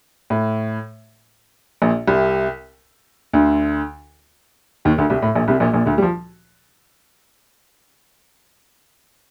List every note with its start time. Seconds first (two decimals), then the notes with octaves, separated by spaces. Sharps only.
0.30 A2
1.82 A#1 A#2
2.07 C2 C3
3.33 D2 D3
4.85 D#2 D#3
4.98 D2 D3
5.10 C2 C3
5.22 A2
5.35 A#1 A#2
5.48 C2 C3
5.60 A#1 A#2
5.74 A#1 A#2
5.86 D2 D3
5.98 G3
6.02 F3